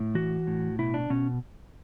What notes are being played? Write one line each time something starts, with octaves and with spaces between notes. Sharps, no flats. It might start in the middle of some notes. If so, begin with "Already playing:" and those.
Already playing: A2
E3 F#4
A2
B2 E4
D4
B2 C#4